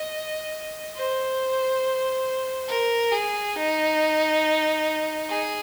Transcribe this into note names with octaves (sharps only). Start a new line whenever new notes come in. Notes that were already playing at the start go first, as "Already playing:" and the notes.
Already playing: D#5
C5
A#4
G#4
D#4
G#4